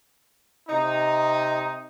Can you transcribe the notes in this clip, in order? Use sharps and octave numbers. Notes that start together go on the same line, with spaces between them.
C3 D#4